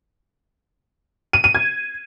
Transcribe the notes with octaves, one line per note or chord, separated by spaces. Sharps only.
D#7
D#7
G#6